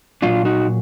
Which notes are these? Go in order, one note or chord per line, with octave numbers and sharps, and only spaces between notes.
A#2 F#3 D4 F4
D#4 F#4